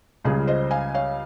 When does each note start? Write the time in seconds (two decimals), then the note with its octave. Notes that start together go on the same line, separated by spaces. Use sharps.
0.24 C#2 C#3 G3 F4 G#4
0.47 C5 D#5
0.71 F5 G#5
0.95 C#5 F5